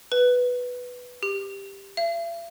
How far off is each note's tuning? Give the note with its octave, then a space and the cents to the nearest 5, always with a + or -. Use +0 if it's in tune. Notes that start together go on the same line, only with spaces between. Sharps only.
B4 +0
G4 +10
E5 +45